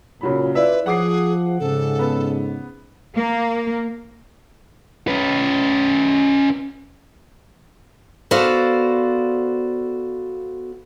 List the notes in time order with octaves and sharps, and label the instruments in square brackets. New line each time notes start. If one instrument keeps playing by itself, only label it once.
[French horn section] A#2 [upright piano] C#3 F#3 B5
[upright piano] E4 E5 [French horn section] F4 D5 [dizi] B4
[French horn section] F3 [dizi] G#4 [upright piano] F#5 D6 C7
[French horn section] G#2 C#3 [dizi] A4
[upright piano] B3
[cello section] A#3
[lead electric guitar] C#4 B4
[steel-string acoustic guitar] B3 F#4 A4 C5 D5 F5